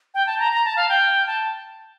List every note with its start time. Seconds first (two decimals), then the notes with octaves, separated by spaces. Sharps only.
0.14 G5
0.27 A5
0.39 A#5
0.52 A#5
0.65 A5
0.76 F5
0.89 G5
1.27 A5